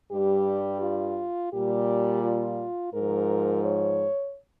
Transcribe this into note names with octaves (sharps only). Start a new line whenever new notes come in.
G2 G3 G4
F4
A#2 G3 G4
F4
G#2 F3 A#4
C#5